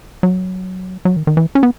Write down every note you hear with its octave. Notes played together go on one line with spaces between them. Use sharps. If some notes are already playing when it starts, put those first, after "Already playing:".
F#3
F#3
D#3
D#3
E3
C#4
B3